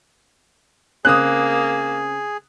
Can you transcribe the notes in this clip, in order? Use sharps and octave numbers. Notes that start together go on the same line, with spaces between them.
C#3 A#3 C4 G#4 D#6 F#6